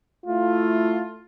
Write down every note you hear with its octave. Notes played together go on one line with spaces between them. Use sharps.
A3 E4 F4